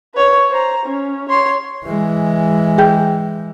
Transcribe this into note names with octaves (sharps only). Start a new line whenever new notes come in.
B4 C#5
C5 A#5
C#4
C#5 C6
E3 G#3
G#4 G5 G6